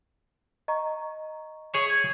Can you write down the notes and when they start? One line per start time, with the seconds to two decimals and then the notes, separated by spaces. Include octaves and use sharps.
0.68 D#5 A#5 C#6
1.74 G#4 C#5 E5 C#6
1.88 G#6